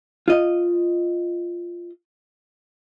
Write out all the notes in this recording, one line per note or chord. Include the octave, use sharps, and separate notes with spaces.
F4 D#5